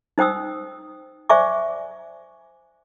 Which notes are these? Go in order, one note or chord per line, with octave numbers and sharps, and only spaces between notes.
D#4 C5 G5 D#6 E6
C5 D5 E5 G#5 C#6 D6